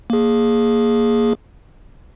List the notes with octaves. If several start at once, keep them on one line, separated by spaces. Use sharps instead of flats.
A#3 G#4